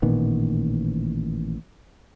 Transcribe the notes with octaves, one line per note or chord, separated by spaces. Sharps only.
A1 A#2 D#3 B3